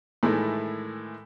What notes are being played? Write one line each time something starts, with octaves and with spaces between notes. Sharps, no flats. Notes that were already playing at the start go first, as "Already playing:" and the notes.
A2 D#3 E3 G#3 A3